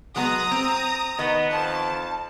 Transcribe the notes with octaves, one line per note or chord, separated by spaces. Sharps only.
F#3 G#3 B3 A#5 D#6 A#6
C4
D#3 B3 D#5
F2 A5